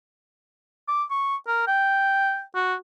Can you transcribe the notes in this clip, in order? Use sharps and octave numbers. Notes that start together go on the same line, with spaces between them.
D6
C#6
A#4
G5
F#4